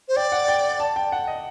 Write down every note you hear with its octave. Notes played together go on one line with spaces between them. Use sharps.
C5
D5 G5
F#5
G5
A5
G5
F#5
D#5